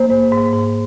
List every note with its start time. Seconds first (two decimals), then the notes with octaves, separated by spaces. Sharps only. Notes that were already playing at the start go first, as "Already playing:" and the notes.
Already playing: A#3 C5
0.10 G#2
0.31 G#2
0.53 G#2